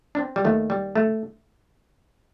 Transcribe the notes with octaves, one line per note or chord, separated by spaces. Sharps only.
D4
C4
G3
D#2 D#3 A3
G3
A3